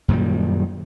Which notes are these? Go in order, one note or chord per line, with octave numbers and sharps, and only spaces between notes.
F#2 A#2 D#3 G3